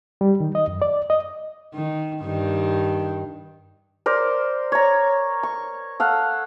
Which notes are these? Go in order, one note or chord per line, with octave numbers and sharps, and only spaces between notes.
G3
D#3
D#5
F#2
D5
D#5
D#3
G2 D#3
A#4 C5 D5
C#5 A#5
C#6
A4 F5 F#5